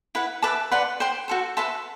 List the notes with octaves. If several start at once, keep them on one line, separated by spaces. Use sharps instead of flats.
E4 B4 F#5
B4 E5 A5 D6
B4 D5 F#5 C6
C5 G5 C6
F#4 A4 C5
B4 E5 A5 C6